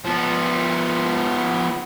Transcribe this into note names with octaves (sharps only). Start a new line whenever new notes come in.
F3 B3